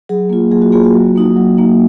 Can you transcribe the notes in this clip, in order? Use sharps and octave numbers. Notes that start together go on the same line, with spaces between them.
F#3 G#4
A#3 F4
F#3 G#4
F#4
A#3 F4 G#4
F#4
F#3
A#3 D#4
F#3
A#3 D#4